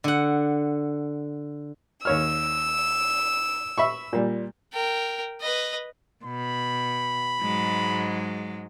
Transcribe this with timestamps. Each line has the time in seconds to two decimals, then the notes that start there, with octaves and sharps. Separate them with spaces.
0.04 D3 F#5
2.05 D#2 C#5 E6 F6
3.78 E5 B5 C#6
4.13 A#2 G3
4.73 A#4 G5
5.41 B4 D#5
6.24 B2 B5
7.42 G#2 F#3 G#3